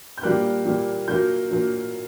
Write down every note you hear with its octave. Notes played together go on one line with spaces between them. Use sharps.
G6
A#2 G3 A#3 F#6
A#2 G3 A#3
A#2 F#3 A#3 G6
A#2 F#3 A#3